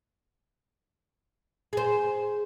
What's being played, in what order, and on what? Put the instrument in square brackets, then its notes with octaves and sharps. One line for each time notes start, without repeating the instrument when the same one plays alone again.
[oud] G#4 C5